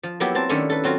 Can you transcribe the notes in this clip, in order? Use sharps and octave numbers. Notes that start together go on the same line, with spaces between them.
F3
F#3 A#3 B3 E4 G4
F#3 C4 A5
D#3 A3 A#3 C#4 D4 E4
A4 B4
F#3 C4 F4 F#4